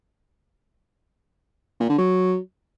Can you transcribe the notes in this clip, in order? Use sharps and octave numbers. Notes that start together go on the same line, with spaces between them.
A#2
D3
F#3